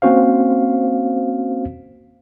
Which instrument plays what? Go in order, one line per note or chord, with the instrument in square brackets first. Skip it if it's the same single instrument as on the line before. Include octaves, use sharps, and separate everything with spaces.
[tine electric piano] A#3 C4 C#4 F#4 C5 F5